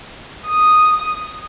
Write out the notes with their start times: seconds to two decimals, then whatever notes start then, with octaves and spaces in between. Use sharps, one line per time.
0.47 D#6